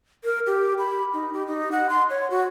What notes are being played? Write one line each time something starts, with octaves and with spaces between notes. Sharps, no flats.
A#4
G4
B5
D#4
G4
D#4
F#5
C6
C#5
F#4